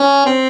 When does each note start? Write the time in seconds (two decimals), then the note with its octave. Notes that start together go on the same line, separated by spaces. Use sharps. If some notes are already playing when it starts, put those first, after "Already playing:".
Already playing: C#4
0.26 C4